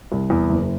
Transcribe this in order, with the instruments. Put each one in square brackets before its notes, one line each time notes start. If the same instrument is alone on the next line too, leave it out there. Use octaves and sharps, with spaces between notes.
[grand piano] C2
E2
F#1